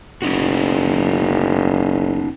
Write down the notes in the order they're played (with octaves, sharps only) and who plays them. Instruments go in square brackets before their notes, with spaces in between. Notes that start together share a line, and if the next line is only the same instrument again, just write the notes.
[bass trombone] F#1 [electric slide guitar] C#4 D#4 F#4